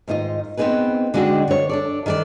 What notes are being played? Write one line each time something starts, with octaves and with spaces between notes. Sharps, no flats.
G#2 D#3 D#4 F4 D#5
B3 C4 D4 D#4 G#4 B4
D3 G#3 D4 D#4 F#4 G5
D3 C#5
D4 A4 D5
D#3 E3 A4 C5 D5